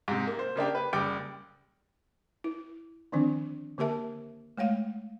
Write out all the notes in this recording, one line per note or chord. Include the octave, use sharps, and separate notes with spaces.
G#2 C3
A#3
C5
C#3 A#3 D4 G4
B4
F#1 G3 G5 D6 D7
E4
D3 D#3 F3 C4 D4
D3 A#3 G4 A#4 E5 A5
G#3 A3 C#5 F5 F#5